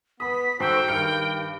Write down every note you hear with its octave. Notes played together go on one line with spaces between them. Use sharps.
B3 B5 D#6 B6
G#2 F#4 A4 C5 G5 C#6
G2 D#3 F6 C#7